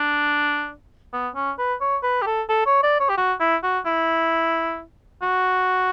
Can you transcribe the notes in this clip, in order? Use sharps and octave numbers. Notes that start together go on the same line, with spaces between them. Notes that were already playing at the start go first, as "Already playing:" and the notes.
Already playing: D4
B3
C#4
B4
C#5
B4
G4
A4
A4
C#5
D5
C#5
G4
F#4
E4
F#4
E4
F#4